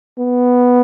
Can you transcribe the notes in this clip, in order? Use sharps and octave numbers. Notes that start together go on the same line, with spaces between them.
B3